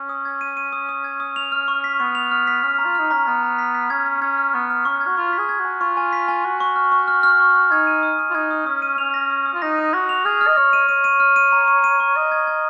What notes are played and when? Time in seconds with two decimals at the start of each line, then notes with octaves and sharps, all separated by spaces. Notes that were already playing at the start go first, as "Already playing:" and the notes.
Already playing: C#4
0.09 D#6
0.25 G#6
0.41 D#7
0.57 D#7
0.73 D#6
0.89 D#6
1.04 G#6
1.20 D#6
1.36 F7
1.52 F6
1.68 C#6
1.84 B6
2.00 B3 C#6
2.15 F7
2.31 F6
2.47 B6
2.63 C#4 F6
2.79 A#5
2.85 F4
2.95 D#4 F6
3.11 C#4 A#5
3.27 B3 A#5
3.43 A#5
3.59 B6
3.75 B6
3.90 C#4 G#6
4.06 G#6
4.22 C#4 G#6
4.38 F6
4.54 B3 C#6
4.70 F6
4.85 C#4 C#6
5.01 G#6
5.07 F#4
5.17 F4 C#6
5.33 B6
5.38 G#4
5.49 G#6
5.59 F#4
5.65 G#5
5.80 F4 C#6
5.97 G#5
6.13 B6
6.28 G#5
6.44 F#4 C#6
6.60 C#6
6.76 F6
6.92 C#6
7.08 F6
7.23 F6
7.40 C#6
7.55 F6
7.71 D#4 G#6
7.87 D#7
8.03 D#6
8.19 D#6
8.31 F4
8.35 D#4 G#6
8.51 D#6
8.66 C#4 D#6
8.82 D#7
8.98 C#4 F7
9.14 A#6
9.30 D#6
9.46 D#6
9.54 F4
9.62 D#4 A#6
9.78 D#6
9.93 F#4 A#6
10.09 F7
10.25 G#4 F6
10.41 F6
10.47 D#5
10.57 C#5 F6
10.73 D#7
10.89 C#5 D#7
11.04 D#7
11.20 F6
11.36 D#7
11.52 A#5
11.68 D#7
11.84 D#7
12.00 C#6
12.16 D#5 D#7
12.32 G#6
12.47 G#6